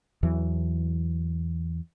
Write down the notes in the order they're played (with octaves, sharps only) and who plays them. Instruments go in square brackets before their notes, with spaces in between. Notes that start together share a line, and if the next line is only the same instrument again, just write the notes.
[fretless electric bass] E2 E3 F#3